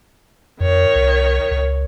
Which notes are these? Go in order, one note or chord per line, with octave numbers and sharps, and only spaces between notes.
F2 D#3 C#5
C2
C#2